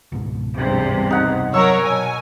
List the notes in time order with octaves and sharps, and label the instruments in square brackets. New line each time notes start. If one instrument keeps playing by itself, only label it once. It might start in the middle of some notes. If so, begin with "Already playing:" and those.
[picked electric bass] C#2 G#2 B2
[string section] E2 G2 C3 [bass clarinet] C4
[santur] D#4 F#5 A#5
[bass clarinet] F#3 [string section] A#4 C#5 [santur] A#5 C#6 E6
[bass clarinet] B2 [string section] G#5